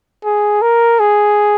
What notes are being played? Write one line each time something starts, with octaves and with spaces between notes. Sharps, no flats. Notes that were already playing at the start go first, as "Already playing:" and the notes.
G#4
A#4
G#4